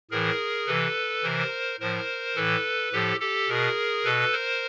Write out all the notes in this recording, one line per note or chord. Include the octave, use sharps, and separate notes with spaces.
A2 E3 G#4 A#4
C3 E3 A4 B4
C3 E3 A#4 C5
A2 F3 A#4 C5
A2 E3 A4 B4
A2 F3 G4 A4
G4 A4
B2 G#4 A#4
B2 A4 B4
A#4 C5